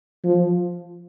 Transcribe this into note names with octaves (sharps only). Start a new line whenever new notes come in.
F3